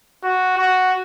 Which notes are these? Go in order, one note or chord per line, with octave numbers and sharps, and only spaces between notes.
F#4
F#4